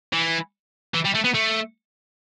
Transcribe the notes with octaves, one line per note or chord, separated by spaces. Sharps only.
E3
E3
G3
A3
B3
A3